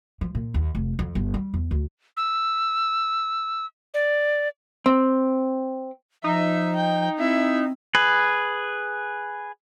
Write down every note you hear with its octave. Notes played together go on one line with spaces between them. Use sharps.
F3
A#2
D#2
F1
F2
G1
G3
E2
D2
E6
D5
C4
F3 D#4 E5
G5
C4 E4 E5
G#4 B4